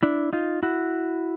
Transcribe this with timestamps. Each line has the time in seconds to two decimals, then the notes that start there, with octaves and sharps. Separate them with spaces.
0.03 D4 E4
0.33 D#4 F4
0.63 E4 F#4